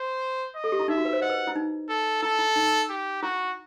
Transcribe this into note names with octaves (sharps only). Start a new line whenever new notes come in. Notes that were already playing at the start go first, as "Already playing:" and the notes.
Already playing: C5
D#5
A4
G4
E4
D#4 E5
F#4
B4
C5
D#5 F#5
B4
E4
D#4
A4
E4 A4
E4
D#4
G4
E4 F#4